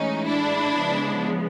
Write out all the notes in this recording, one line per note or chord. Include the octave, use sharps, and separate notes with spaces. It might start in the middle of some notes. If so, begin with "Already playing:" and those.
Already playing: A2 E3 G#3 C#4 D#4
D4 E4
C#3 F3 G#3 B3